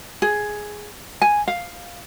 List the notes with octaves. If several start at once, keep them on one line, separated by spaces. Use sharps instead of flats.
G#4
G#5
F5